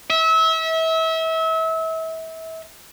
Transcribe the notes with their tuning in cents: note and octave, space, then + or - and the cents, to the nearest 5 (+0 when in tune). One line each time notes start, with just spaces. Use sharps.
E5 -30